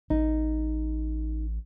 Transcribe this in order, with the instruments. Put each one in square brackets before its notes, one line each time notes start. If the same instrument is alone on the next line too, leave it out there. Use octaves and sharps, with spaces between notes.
[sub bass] A1 [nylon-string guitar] D#4